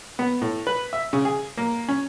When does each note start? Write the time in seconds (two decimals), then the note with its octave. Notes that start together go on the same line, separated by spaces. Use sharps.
0.19 B3
0.42 A2
0.67 B4
0.93 E5
1.13 C#3
1.25 G#4
1.58 A#3
1.89 C#4